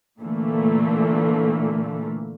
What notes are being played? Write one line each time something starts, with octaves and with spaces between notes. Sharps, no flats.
A#2 D3 E3 A3 A#3